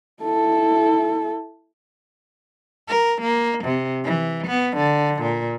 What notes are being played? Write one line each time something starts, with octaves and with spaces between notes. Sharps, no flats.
E4 A4
A#4
A#3
C3
E3
B3
D3
A#2